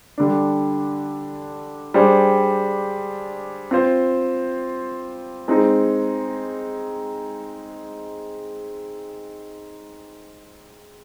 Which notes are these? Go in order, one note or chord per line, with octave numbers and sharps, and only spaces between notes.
D3 G3 D4
G3 D4 G#4 C5
C4 F4 C5
G#3 C4 D#4